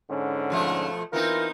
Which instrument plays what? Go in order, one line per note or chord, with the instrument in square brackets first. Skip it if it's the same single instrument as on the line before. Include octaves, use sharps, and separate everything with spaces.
[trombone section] G#2 D3 C#4
[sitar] B2 F3 A3
[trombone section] E3 F4 A#4 [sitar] B3 C4 D#4